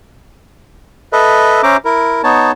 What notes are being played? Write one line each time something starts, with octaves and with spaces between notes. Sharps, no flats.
A4 B4 D#5 E5
C#4 C5 E5 A#5 D6
E4 A#4
B3 D#4 C#5 A5